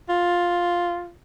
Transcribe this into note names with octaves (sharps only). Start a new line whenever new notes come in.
F4